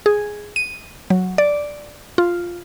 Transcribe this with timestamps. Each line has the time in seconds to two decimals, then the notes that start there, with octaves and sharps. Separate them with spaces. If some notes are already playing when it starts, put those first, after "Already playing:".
0.06 G#4
0.56 D#7
1.10 F#3
1.38 D5
2.18 F4